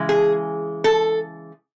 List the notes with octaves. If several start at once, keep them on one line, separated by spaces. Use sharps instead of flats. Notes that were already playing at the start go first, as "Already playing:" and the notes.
Already playing: C#3 E3 G#3
G#4
A4